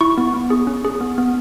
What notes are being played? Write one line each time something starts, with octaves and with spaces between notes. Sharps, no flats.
E4 C#6
B3
B3
G#4
C#4
G#4
B3
B3